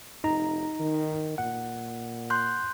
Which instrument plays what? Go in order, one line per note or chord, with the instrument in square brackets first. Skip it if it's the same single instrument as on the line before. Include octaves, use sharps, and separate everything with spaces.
[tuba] F1 [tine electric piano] D#4 A#5
[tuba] D#3
[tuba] A#2 [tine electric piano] F#5
[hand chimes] C6 F#6 G6